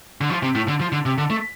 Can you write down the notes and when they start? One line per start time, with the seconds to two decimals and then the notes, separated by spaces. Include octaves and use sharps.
0.21 D3
0.30 F3
0.43 C3
0.55 A2
0.68 D3
0.80 F3
0.92 D3
1.06 C3
1.18 D3
1.30 A3